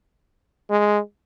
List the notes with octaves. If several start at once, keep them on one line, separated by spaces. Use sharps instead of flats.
G#3